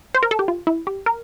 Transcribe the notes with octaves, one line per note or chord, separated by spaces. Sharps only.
C5
A#4
A4
G4
F4
E4
G4
A#4